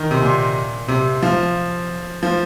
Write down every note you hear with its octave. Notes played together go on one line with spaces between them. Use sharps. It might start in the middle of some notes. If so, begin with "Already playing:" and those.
Already playing: D#3
C3
A#2
C3
F3
F3